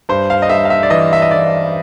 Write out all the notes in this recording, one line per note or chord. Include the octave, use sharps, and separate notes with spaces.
G2 C5
F5
D#5
G2 E5
F5
E5
D5
E3 D#5
E5
D#5
E3 D5